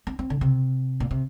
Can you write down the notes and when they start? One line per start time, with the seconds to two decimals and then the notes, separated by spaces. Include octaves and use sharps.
0.07 C4
0.19 C4
0.30 D3
0.41 C3
1.00 A#2
1.11 C3